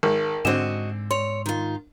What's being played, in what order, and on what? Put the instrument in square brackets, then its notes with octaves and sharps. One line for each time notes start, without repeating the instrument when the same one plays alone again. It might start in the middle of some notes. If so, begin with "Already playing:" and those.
[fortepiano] G#1 [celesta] A#4
[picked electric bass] G#2 [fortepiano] D3 C4 [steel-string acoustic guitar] F#4 D#5 [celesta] E7
[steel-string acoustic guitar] C#5 [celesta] C6 F7
[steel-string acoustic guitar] D#3 F4